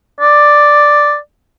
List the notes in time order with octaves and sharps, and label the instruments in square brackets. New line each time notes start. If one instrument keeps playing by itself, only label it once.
[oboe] D5